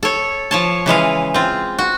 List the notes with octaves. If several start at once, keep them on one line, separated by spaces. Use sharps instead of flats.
A4 C#5
F3 C#5 A5
C#3 E3 G#3 F5
C4 F4
F#4